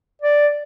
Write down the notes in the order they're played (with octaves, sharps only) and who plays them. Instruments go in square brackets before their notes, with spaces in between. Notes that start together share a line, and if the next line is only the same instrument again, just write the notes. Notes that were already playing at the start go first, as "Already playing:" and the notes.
[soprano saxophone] D5